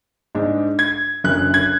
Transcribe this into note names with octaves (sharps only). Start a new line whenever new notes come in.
G#2 G#3 D4
G#6
F#1 F#2 D3 F#6
G#6